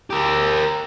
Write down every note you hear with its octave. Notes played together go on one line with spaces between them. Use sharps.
G4 A#4